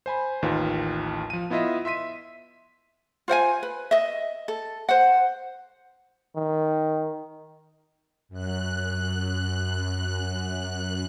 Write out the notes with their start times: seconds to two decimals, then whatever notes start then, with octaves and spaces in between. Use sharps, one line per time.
0.06 C5 G#5 B5
0.42 A1 D#2 D#3 F4 B4
1.30 F3 D#7
1.50 B3 E4 F4 D#5 E5
1.85 E5 C6 B6 D#7
3.28 F4 C5 F#5 G#5
3.63 B4
3.91 D#5 E5
4.48 A4
4.89 C5 F#5
6.36 D#3
8.29 F#2 F#6